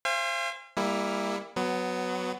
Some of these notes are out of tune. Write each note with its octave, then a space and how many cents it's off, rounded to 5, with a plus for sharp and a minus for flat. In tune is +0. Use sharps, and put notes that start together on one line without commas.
C5 +15 F5 -40 G#5 -40
G3 +30 A#3 +0 E4 +0
F#3 +0 B3 +15